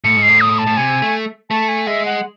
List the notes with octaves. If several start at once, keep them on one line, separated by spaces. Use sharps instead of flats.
A2 C#7
G#2
C7
A2
D#6
A5
A2
C3 G#5
A3
A3 A5
G#5
G#3 E5
F#5